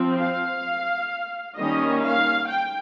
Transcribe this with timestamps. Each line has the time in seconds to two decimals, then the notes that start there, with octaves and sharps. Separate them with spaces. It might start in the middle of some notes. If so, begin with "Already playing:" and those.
Already playing: F3 C4
0.18 F5
1.57 D#3 G3 A#3 C#4 D#5
2.03 F5
2.49 G5